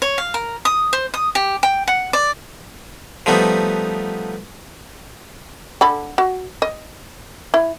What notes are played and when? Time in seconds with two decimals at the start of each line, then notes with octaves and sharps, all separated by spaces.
0.02 C#5
0.18 F5
0.34 A#4
0.65 D#6
0.93 C5
1.14 D#6
1.35 G4
1.63 G5
1.88 F#5
2.13 D5
3.26 F3 G3 A3 B3 D#4
5.81 D3 A4 B5
6.18 F#4
6.62 D#5
7.54 E4